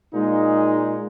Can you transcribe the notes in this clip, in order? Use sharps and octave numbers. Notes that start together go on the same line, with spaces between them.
A#2 G#3 D#4